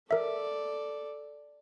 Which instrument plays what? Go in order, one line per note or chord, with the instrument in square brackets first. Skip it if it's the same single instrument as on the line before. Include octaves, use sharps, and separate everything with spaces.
[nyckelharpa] A4 D5 [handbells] A#4 E5